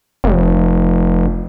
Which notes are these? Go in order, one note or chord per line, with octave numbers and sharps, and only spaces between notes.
F1